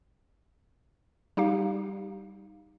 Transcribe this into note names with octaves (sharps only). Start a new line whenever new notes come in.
G3 D#4 G4 F5